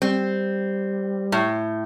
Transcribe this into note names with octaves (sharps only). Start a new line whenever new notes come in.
G3 C4
A2